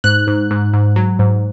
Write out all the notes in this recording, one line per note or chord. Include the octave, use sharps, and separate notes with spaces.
G#2 F#6
G#2
G#2
G#2
F#3
G#2